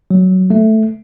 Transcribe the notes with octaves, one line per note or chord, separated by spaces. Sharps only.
F#3
A3